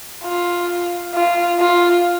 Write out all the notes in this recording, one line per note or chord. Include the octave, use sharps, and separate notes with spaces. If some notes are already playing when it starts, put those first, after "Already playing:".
F4
F4
F4